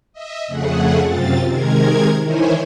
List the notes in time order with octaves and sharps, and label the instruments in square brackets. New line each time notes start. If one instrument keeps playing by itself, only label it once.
[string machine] D#5 E5
F2 C#3 A3 G#4 F#5
F#2 C3 C4 F4 A6
C3 D#3 G#3 A#4 G#6
D#3 E3 E4 C5 C#5 G#5